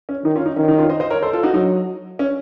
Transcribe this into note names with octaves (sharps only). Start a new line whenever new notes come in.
C#4
D#3 D#4
C#4 F4
D#4
D#3 C#4
D#4
C#4 F4
C5 D#5
C5 D#5
A#4 C#5
A4 C5
F4 A4
D#4 F#4
F#3 D#4
C#4